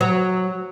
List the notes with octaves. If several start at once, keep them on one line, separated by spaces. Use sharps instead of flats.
F#3